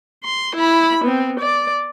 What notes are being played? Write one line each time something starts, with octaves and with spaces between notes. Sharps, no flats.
C6
E4 B5
B3 C4
D5